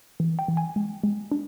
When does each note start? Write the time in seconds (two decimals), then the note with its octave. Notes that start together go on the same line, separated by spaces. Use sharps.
0.20 E3
0.39 G5
0.48 E3
0.57 G#5
0.76 G#3
1.03 G#3
1.31 D4